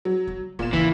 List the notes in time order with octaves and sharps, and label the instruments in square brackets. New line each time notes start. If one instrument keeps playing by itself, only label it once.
[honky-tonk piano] F#3
[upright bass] G3
[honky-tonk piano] A#2 E7 [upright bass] B3
[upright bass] G#1 C#2 [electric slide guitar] E3